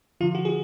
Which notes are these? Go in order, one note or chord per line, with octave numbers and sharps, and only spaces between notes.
D3 F3 F4
F#4
G#4
F#4